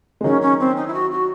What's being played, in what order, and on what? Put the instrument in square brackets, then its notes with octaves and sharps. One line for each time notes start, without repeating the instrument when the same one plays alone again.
[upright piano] G#3
[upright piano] D#3 F#3 [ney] C#4
[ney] C#4
C4
D#4
E4
F#4
F#4